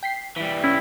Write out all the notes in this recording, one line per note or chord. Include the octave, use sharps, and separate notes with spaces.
G5 B6 C7
E3 G3 B6
C#4 E4